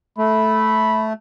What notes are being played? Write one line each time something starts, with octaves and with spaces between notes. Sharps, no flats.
A3 B5